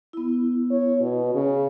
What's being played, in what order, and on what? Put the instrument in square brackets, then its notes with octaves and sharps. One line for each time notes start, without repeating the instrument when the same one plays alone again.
[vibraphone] B3 E4
[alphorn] C#5
B2
C#3